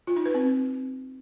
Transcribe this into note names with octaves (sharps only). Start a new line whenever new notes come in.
F4
D#4
B4
C4